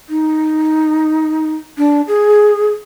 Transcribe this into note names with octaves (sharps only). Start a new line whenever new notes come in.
D#4
D4
G#4